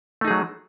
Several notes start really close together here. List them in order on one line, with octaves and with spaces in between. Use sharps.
A3 D#4 G#4 F#3